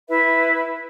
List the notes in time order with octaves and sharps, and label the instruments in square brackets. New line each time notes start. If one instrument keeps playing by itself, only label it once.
[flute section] E4 B4 E5